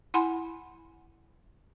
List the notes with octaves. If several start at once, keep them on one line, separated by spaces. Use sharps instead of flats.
E4 F#5 G#5 B5 C6